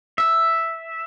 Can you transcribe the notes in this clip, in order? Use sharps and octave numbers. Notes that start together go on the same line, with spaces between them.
E5